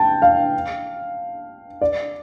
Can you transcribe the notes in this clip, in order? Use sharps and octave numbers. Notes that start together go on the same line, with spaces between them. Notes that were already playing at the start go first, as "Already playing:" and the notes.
Already playing: G5 A5
F5
D5